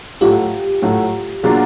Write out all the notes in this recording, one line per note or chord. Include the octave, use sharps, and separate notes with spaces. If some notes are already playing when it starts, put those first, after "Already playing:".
A2 F#3 A3 F4 G4
A2 F#3 A3
B2 F#3 A#3 D4 F4 F#4 G#4